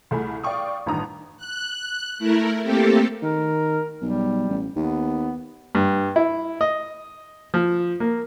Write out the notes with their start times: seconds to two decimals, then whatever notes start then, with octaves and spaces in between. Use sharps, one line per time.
0.11 C2 A3 G#4 B5
0.44 D5 F5 G5 C#6 D#6
0.86 A1 G2 D#3 A#5 D#6
1.37 F#6
2.18 A3 E4 A#4
2.62 A3 A#3 C4 G4 A4
3.22 D#3 A#4
4.01 B1 G3
4.49 A1
4.76 D#2 B3
5.75 G2
6.16 E4
6.61 D#5
7.54 F3
8.00 A#3